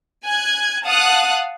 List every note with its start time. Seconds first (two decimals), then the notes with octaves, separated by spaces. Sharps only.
0.25 G#5 F#6 G#6
0.85 F5 F#5 A5 D#6 F#6